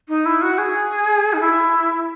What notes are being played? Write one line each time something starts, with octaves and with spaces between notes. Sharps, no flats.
D#4
E4
F#4
G#4
D#4
E4